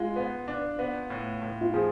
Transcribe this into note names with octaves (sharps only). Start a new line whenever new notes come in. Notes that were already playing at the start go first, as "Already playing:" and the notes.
Already playing: G#3 F4
B3
D4
B3
A2
A2
F4
F3 G#4